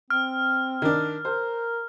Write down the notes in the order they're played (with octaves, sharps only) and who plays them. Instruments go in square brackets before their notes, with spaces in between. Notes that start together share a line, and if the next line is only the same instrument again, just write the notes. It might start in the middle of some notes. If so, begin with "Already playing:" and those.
[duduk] C4 [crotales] F6
[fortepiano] D#3 D4
[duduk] A#4 [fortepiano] C5